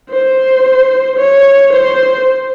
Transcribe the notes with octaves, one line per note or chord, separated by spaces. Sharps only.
C5
C#5
C5